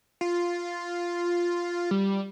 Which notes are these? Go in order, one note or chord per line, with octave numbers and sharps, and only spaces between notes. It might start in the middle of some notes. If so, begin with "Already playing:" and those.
F4
G3